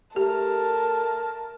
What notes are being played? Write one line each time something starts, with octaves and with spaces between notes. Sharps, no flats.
A3 G4 A#4 A5